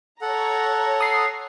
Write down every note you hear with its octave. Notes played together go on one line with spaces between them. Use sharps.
A4 C#5 F#5 A#5
D#6 C7